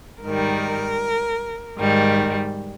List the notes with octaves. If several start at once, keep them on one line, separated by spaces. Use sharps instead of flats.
G#2 D#3 G3 A#4
G#2 D#3 G3